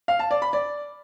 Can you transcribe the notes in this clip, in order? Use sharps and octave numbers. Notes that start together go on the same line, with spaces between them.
F5
A5
D5
B5
D5